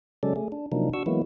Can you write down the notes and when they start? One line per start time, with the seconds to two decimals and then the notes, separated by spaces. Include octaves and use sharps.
0.23 C#3 F#3 G#3 C#4 A4 D5
0.36 A3 G#4
0.52 D4
0.72 C3 F3 F#3 A#3 D4 D#4
0.94 D4 F#4 C#6 E6
1.06 E3 F#3 G#3 A#3 B3 E4